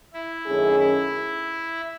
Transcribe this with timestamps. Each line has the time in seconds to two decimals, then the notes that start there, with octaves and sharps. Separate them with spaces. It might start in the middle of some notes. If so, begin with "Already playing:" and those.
0.13 E4
0.46 F#2 D#3 A3 C#4 G#4
0.79 E4